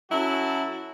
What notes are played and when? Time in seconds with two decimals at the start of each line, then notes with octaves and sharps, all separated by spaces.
0.11 F#3 C#4 E4 F#4 A4